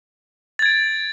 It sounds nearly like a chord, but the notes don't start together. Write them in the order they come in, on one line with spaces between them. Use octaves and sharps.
A6 G#6 D7